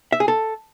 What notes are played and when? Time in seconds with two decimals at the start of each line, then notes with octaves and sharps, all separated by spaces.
0.12 E5
0.20 G#4
0.28 A4